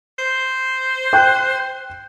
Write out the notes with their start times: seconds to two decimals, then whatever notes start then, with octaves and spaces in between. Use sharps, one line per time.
0.19 C5
1.13 G5 F#6 G6